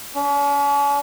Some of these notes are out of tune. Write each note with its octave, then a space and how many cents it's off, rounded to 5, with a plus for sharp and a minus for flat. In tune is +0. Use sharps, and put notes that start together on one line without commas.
C#4 +45